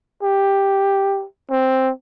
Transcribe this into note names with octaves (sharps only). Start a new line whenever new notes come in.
G4
C4